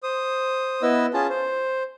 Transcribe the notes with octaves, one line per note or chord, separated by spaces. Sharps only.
C5 D#6
B3 E4 B4 D#5 E6
C#4 F4 G#4 A5
C5